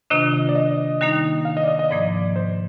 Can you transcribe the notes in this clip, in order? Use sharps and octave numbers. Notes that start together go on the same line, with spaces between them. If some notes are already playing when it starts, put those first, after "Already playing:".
C3 D#3 A#3 D4 F4 D#5
D#5
D5
D#5
D#3 G3 A#3 D#4
F5
D#5
D5
D#5
D#5
G#2 F3 A#3 D5
C5